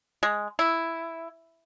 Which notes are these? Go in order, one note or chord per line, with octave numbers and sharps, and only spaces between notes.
G#3
E4